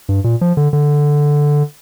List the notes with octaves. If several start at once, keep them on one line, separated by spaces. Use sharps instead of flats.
G2
A#2
F3
D3
D3